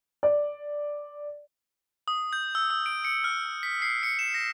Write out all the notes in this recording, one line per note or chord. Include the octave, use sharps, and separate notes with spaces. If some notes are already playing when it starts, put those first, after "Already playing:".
D5
D#6
G6
E6
E6
D7
C#7
F6
B6
C7
C#7
E7
A#6